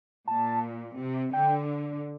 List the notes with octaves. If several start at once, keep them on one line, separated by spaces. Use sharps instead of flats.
A#2 A5
C3
D3 G5